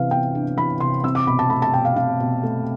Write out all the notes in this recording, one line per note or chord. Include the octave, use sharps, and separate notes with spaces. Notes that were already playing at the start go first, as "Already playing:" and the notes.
Already playing: C3 E3 B3 B4 F5
B3 G5
D4
E3 B5
C3 C6
C4 E6
D6
B2 B5
A5
A3 B5
A5
B2 G5
F5
C4 F5
B2
A3